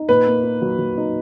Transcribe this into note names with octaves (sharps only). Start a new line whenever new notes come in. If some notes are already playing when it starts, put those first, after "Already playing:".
Already playing: D#4
A#2 B4
A#3
D#4
F#3
F#3
D#4